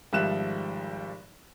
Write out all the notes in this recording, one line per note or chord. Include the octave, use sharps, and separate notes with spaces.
G#1 F3 G3 E5 F#6 E7